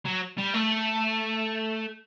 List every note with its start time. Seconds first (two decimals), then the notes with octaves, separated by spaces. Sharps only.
0.05 F#3
0.38 G3
0.54 A3